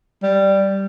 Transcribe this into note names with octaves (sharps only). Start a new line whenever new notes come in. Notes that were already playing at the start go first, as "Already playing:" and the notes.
G3